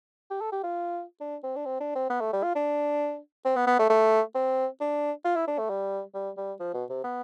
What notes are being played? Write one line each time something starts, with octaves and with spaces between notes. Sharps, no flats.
G4
A4
G4
F4
D4
C4
D4
C4
D4
C4
B3
A3
G3
F4
D4
C4
B3
B3
A3
A3
C4
D4
F4
E4
D4
A3
G3
G3
G3
F3
B2
C3
B3